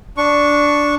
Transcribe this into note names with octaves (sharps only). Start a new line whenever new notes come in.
D4 C#6